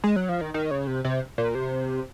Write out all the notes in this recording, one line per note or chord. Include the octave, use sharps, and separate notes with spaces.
G#3
F#3
F3
D#3
D#3
C#3
C3
C3
A#2
C3